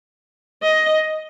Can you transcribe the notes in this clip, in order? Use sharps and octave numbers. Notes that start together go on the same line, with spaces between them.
D#5